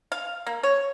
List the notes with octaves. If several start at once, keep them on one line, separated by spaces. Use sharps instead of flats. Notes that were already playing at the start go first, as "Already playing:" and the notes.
F5
A#3
C#5